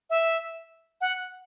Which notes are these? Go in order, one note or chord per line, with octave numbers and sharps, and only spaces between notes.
E5
F#5